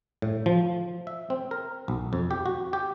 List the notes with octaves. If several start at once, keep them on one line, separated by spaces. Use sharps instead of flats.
A2
F3
E5
C4
A#4
B1
F2
G4
F#4
G4